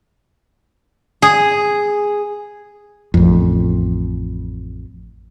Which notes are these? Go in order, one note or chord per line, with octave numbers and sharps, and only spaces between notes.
G#4
A1 F2